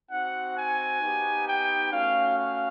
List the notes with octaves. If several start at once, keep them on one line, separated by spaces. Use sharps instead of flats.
C4 D#4 F#4 F#5
G#5
B3 D#4 G4
G5
A3 C#4 F#4 F5
F5